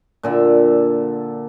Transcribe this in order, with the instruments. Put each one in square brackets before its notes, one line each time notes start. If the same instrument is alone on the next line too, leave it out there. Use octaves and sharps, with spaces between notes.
[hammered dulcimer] A#2 D3 E5